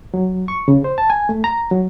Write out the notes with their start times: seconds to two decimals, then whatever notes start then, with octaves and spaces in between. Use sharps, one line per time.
0.14 F#3
0.48 C#6
0.68 C#3
0.84 C5
0.98 A5
1.10 G#5
1.29 A3
1.44 A#5
1.71 F#3